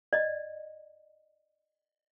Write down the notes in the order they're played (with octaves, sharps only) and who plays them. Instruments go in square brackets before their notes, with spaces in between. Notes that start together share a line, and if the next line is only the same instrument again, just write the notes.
[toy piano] D5 D#5